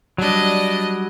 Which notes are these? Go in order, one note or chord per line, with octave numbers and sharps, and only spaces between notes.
F#3 G3 D4 D#5